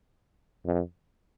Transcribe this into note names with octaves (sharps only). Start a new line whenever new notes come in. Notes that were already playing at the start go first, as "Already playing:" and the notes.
F2